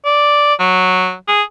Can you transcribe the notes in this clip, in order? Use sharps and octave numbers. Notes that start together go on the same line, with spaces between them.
D5
F#3
G#4